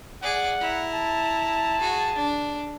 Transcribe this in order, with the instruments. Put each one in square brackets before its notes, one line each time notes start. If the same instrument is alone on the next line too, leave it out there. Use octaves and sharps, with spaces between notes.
[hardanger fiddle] G#4 D5 [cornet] F#5
[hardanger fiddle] E4 A#5
[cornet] A5
[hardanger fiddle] F#4 G#4
D4